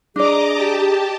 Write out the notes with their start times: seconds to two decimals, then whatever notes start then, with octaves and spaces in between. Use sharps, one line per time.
0.16 D4 G#4 D5 D#5 A#5 D6
0.53 G4 A5